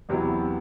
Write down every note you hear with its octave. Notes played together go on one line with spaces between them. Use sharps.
E2 C3 F#3 B3 E4